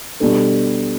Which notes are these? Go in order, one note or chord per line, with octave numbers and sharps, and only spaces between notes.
B2 G3 D4 A4